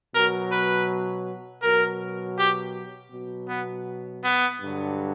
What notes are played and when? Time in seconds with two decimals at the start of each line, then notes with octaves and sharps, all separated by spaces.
0.14 B2 F#3 A#4
0.52 B4
1.62 B2 F#3 A#4
2.38 G4
3.12 B2 F#3
3.49 B3
4.24 B3
4.61 G2 D3 F#3